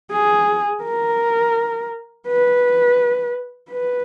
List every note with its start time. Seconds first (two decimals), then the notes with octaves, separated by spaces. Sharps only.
0.11 G#4
0.84 A#4
2.27 B4
3.70 B4